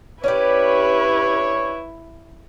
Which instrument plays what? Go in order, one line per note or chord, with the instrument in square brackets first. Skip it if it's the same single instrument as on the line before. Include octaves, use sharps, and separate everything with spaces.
[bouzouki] C#4 D4 G4 [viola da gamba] E4 [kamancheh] B4 [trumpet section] C#5